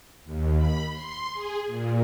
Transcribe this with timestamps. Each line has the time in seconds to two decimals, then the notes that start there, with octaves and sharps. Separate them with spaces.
0.25 D#2
0.57 B5
0.91 C6
1.34 G#4
1.67 A#2